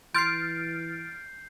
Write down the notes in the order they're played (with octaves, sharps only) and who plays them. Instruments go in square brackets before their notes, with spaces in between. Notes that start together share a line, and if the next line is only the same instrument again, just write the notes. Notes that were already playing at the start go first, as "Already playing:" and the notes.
[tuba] E3 [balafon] C6 [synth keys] F6 A6 D7 [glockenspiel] G6 C7